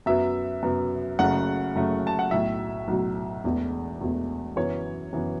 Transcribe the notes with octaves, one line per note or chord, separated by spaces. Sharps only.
F#2 F#3 B3 E5
F#2 F#3 B3
F#1 F#2 C#3 A3 F#5
F#1 F#2 C#3 A3
A5
F#5
B1 A2 F#3 E5
B1 A2 F#3
E1 E2 B2 A3
E1 E2 B2 A3
F#2 E3 B3 C#5
F#2 E3 B3